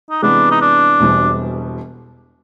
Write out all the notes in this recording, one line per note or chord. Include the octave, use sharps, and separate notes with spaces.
D#4
C3 E3 G#3 B3 D4
D#4
D4
E1 E2 B2 G3 C4